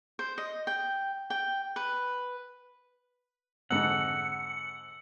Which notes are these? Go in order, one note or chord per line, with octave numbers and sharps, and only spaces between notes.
C5
D#5
G5
G5
B4
F2 G#2 D3 F#5 E6 C#7